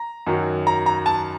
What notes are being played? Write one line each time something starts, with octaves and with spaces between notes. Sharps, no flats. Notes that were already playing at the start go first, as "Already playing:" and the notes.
Already playing: A#5
F#2 D#3 F#3
A#5
A#5
A5